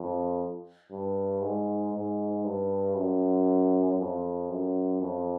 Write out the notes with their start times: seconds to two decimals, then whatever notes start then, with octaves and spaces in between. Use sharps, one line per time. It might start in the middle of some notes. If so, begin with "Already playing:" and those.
Already playing: F2
0.91 G2
1.42 G#2
1.93 G#2
2.44 G2
2.95 F#2
3.98 F2
4.49 F#2
5.01 F2